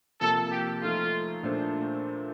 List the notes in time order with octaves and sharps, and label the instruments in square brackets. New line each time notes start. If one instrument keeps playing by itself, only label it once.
[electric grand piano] C3 F3 A#3 [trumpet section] A4
[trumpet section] G4
[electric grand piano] F3 A3 D#4 A4 [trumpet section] F4
[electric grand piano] A#2 A3 D4 A4 C5